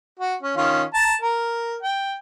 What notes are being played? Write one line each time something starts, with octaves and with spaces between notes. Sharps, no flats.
F#4
C#4
D#3 C#4 F4
A5 A#5
A#4
G5